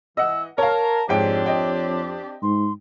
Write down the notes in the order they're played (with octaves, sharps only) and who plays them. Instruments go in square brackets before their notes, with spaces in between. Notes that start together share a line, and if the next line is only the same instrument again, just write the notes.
[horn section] E3 [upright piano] D#5 F#5 [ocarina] E6
[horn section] A#4 [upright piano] C#5 F5 [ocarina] A5
[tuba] F2 [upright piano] G#2 G#3 G5 [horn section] C4 D4 G4 [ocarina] C#5
[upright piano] D#5 G5
[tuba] G#2 [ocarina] C6